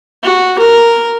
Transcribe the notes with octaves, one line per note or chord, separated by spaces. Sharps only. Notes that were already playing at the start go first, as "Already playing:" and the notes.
F#4
A#4